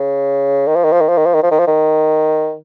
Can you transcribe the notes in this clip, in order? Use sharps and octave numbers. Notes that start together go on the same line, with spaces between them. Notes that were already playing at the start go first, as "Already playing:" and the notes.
Already playing: C#3
D#3
F3
D#3
F3
D#3
F3
D#3
F3
D#3
F3
D#3
F3
D#3